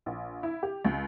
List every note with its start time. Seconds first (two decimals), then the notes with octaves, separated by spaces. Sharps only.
0.06 A#1
0.43 E4
0.63 G4
0.85 C#2